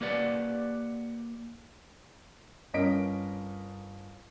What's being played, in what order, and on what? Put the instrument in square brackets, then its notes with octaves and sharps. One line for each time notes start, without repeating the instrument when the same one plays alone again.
[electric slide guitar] A#3 G4 B4 D5 F#5
[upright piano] G1 C#4 A#4 D#5 B6 D7